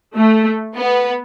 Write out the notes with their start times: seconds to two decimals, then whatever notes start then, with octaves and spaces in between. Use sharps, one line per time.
0.15 A3
0.76 B3